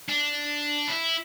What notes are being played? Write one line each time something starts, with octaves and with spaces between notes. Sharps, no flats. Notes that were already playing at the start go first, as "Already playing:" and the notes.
D4
E4